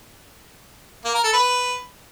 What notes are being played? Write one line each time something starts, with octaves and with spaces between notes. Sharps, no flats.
A#3
A#4
A4
B4